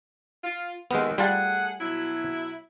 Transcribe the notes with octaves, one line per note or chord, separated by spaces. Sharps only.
F4
D#2 D#3 G#3 B3
G3 A3 F4 G#4 F#5 A5
B2 F#3 E4